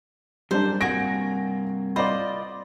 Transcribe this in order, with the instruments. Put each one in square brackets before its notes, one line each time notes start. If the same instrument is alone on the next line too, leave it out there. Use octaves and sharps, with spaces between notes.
[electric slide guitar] F#2 A#4 A5 [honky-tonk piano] G3 D4 [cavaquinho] C5
[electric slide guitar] G2 C3 A#3 [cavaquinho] F#4 G#5 C#6 [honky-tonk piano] A#6 D7
[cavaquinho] F4 C5 D#5 [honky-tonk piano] D5 B5